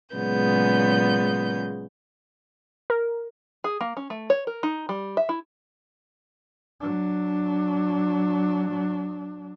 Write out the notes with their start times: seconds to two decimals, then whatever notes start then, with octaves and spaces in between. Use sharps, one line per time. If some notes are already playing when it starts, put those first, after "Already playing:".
0.15 A#2 C#3 F#3 G#3 B3 G6
2.90 A#4
3.64 G#4
3.81 A#3
3.97 C#4
4.10 A3
4.30 C#5
4.47 A#4
4.63 D#4
4.89 G3
5.17 E5
5.29 E4
6.81 F#3 D4